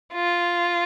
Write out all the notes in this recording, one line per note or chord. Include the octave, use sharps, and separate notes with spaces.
F4